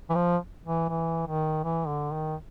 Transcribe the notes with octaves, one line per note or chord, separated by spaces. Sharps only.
E3
F3
E3
E3
D#3
E3
D3
D#3